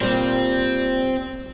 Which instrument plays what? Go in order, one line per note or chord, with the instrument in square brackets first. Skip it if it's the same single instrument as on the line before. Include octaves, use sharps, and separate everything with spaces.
[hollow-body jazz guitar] A#2 G3 [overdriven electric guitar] C4